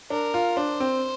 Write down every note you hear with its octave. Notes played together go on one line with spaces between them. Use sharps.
D4 A#4
F4
D4 C5
C4